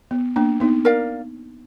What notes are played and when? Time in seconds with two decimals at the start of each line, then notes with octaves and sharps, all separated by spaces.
0.11 B3
0.36 A#3 D4
0.60 B3 D#4
0.85 A#4 D5 F5